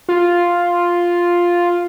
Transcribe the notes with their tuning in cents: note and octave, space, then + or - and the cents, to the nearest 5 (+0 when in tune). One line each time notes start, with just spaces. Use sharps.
F4 +0